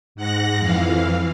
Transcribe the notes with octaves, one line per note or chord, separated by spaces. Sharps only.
G#2 F#5 F#6 A#6
F2 E3 F5